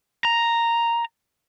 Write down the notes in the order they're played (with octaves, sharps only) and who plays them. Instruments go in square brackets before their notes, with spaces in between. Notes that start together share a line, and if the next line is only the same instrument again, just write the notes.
[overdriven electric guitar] A#5